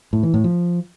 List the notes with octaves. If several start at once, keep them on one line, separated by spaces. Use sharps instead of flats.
A2
E3
A2
F3